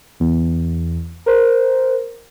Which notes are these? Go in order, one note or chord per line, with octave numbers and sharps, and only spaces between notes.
E2
A#4 C5